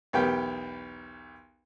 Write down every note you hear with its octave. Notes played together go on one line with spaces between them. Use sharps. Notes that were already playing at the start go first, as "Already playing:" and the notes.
B1 E2 B3 G4 A#4 G5